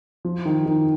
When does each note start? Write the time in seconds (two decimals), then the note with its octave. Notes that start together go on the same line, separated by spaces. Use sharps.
0.25 F3
0.45 D#3
0.66 D#3